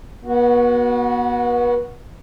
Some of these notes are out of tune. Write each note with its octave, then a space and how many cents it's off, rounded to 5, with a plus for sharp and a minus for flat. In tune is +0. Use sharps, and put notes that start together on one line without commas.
B3 -35 F#4 +0